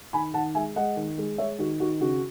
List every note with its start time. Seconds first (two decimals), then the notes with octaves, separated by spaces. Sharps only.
0.13 D#3 G#5 B5
0.34 D#3 F#5 A5
0.55 G#3 E5 G#5
0.76 G#3 D#5 F#5
0.96 D#3
1.18 G#3
1.38 G#3 C#5 E5
1.59 D#3 F#4
1.80 D#3 F#4
2.01 C#3 F#4